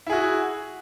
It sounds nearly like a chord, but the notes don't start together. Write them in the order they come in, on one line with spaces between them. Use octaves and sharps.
E4 G#4 F#4